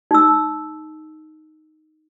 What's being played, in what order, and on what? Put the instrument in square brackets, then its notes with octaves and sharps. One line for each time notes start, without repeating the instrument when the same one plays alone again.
[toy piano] D#4 E6